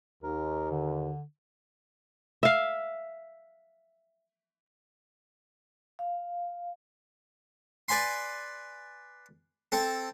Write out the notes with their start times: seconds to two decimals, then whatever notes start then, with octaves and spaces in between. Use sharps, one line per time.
0.23 D#2 A#4
0.71 D3
2.43 E5 F5
5.99 F5
7.88 B4 D5 G#5 B5 C6
9.72 C4 A4